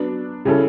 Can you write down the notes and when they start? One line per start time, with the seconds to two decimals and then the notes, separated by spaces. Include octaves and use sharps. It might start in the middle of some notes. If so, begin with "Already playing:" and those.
Already playing: F#3 B3 D4
0.45 C#3 G3 C#4 E4 A4